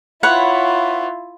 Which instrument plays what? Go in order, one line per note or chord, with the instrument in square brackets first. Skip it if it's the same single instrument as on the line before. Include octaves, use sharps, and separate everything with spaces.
[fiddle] E4 F4 [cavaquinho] B4 C#5 F#5